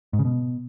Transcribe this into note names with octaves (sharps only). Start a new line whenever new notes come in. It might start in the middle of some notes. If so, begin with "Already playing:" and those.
G#2
C#3
B2